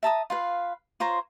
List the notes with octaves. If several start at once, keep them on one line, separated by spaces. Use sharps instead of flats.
E5 A5 A#5 D#6
F4 B4 F5
F4 C5 C#5 A#5